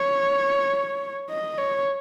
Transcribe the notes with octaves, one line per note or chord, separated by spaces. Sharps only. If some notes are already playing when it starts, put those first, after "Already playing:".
Already playing: C#5
D#5
C#5